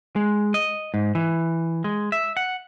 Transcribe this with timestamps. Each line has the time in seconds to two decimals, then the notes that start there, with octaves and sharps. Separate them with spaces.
0.16 G#3
0.54 D#5
0.94 G#2
1.15 E3
1.84 G#3
2.12 E5
2.37 F#5